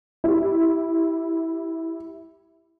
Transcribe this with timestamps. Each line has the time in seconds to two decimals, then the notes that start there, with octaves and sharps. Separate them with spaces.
0.24 E4 G4